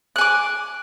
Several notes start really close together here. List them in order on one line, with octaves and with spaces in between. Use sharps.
F#6 G#5 D6